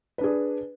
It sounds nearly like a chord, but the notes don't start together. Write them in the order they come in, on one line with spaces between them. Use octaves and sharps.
B4 D4 G#4